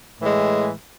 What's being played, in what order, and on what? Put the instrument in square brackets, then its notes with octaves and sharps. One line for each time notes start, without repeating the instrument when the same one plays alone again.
[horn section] A2 E3 G#3